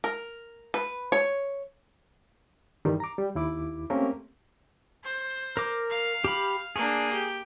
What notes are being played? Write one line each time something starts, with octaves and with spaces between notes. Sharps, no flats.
A#4
B4
C#5
G2 D#3 E3 G3
A#5 D6
G3
D#2 E4 D6
A3 A#3 C4 C#4 G4 A#4
C5
A#4 D6
F5
G4 B5
A#3 D4 G#4
G4